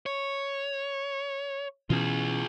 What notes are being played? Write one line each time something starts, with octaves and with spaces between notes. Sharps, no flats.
C#5
B2 E3 C#4 F4 G#4